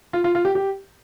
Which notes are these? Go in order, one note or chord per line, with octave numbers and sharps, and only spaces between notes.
F4
F4
F4
G4
G4